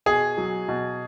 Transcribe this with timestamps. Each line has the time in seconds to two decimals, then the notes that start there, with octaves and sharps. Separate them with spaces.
0.06 B2 G#4
0.38 F#3
0.68 B2